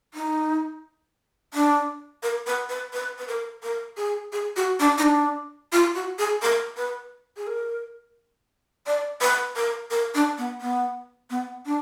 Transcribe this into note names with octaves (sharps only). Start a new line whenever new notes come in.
D#4
D4
A#4
B4
B4
B4
B4
A#4
A#4
G#4
G#4
F#4
D4
D#4
D4
F4
F#4
G#4
A#4
B4
G#4
A#4
D5
B4
A#4
A#4
D4
B3
B3
B3
D4